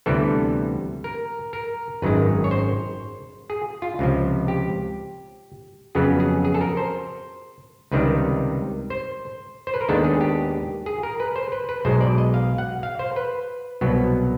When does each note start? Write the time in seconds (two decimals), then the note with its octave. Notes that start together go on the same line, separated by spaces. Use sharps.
0.06 D2 C3 E3 G3 B3 A4
1.04 A#4
1.53 A#4
2.02 G#1 F#2 D#3 G#3 B4
2.44 C#5
2.51 C5
3.50 G#4
3.82 F4
3.99 C#2 C3 F3
4.48 G4
5.95 F2 C#3 F#3 B3 G#4
6.20 G#4
6.45 G#4
6.54 A4
6.61 A#4
6.77 C5
7.92 C#2 C3 D#3 G3 B4
8.90 C5
9.67 C5
9.74 B4
9.81 A#4
9.89 D#2 D#3 G#3 B3 D4 A4
10.04 G#4
10.21 G4
10.86 G#4
11.03 A#4
11.20 B4
11.36 C5
11.52 B4
11.69 B4
11.85 B1 B2 G#3 C5
12.01 D5
12.18 D#5
12.34 F5
12.58 F#5
12.83 F5
12.99 C5
13.16 B4
13.81 C2 B2 F#3 B3